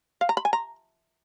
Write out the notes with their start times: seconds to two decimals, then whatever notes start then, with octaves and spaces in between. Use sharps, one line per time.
0.21 F5
0.29 A#5
0.37 B5
0.45 G#5
0.53 A#5